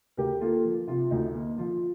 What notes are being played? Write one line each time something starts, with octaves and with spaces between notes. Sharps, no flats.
D2 G4 A#4
A#3 F4 A4
F3
C3 F4
D2 D#4
A#3
F3 F4